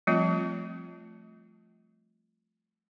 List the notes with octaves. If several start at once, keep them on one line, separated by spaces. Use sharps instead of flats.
F3 G3 A3 C4 F4